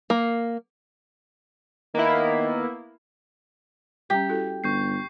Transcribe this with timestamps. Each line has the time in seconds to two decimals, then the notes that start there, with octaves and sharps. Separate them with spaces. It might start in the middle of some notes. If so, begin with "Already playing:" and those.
0.10 A#3
1.95 D#3 A#3 B3 E4
4.10 G3 C#4 G4
4.29 E4 F#4 A4
4.64 G1 C#6 G6 C7